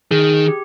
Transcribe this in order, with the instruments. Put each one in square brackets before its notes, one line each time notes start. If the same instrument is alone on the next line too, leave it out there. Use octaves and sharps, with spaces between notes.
[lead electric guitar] D#3 [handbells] G#4
[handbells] G4